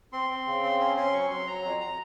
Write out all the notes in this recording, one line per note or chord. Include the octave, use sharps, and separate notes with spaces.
C4 C6
C4
C#3
C4
C#4 C6
C#4 C6
F#3 C#6
F#3 C6
F#3 A#5
F2
A#5